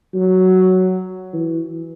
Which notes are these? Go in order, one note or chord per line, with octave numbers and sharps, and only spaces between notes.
F#3
E3